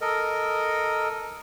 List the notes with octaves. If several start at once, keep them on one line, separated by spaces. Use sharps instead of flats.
A4 A#4 D#5